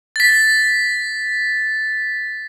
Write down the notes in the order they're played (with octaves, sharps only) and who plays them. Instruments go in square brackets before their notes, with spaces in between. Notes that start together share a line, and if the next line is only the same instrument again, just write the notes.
[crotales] A6 B6